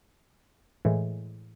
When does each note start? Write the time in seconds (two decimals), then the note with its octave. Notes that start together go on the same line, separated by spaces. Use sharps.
0.85 A2 E3 G#3